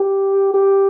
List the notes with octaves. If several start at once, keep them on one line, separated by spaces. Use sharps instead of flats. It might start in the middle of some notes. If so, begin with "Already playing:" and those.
Already playing: G4
G4